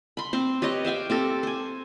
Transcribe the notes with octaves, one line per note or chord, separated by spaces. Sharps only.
B5 C6
C4 C5
G4 B4 C#5 D#5
C5 E5 F5 G5
C4 G4 A4
C5 G#5